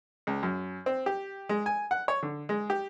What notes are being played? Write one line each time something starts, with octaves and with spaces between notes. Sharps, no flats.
C#2
F#2
C4
G4
G#3
G#5
F#5
C#5
D3
G#3
G4